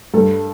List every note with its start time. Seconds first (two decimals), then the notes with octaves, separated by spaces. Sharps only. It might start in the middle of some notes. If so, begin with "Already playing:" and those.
0.14 G2 A4